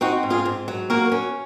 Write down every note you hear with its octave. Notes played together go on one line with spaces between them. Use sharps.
C4 D#4 F#4
G#2
F4 G#4
G#2
F#3
A#3 F#4 A#4
C#4